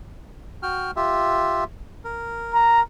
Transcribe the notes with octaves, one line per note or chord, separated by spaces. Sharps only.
F#4 G5 F6
F4 G4 E5
A#4
A#5